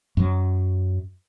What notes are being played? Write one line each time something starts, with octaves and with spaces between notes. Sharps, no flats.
F#2 F#3